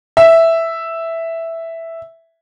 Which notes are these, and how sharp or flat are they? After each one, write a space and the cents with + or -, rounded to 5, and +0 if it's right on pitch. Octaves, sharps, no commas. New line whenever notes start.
E5 +0